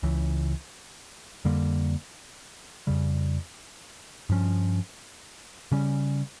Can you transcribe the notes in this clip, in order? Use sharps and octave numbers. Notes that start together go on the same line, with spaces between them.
C#2 C#3 E3
F2 D3 G3 A#3
F2 C#3 G3
G2 F3 C#4
C#3 G3 C#4